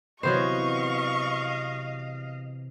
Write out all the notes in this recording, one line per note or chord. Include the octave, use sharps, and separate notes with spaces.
C3 E3 F#3 B3 C5 D#5 F5 C#6